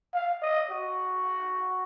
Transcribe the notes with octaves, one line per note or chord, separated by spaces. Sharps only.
F5
D#5
F#4